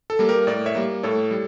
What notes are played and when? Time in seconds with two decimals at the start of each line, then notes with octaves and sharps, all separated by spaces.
0.10 A4
0.19 G3 A#3
0.29 G4 A#4
0.47 A2 A#4 D5
0.66 C#5 E5
0.75 G3 A#3
1.03 A2 A4 C#5
1.31 G3